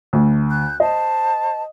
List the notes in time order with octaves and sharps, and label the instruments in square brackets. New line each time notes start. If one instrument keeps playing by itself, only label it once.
[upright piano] D2
[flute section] F#6 G6
[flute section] C5 A5 [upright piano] D#5